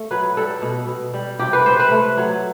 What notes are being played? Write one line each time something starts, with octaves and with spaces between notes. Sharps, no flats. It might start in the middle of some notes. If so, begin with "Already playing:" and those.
Already playing: A3
F#3 B4
G3 A4
B2
B2
G3
C3 G4
B4
C3 C5
B4
A3
F#3